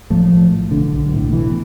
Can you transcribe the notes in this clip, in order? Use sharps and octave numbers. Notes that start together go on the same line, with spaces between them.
A2 F3 A3
B1
A2
B1 D3
B1
A2
B2 E3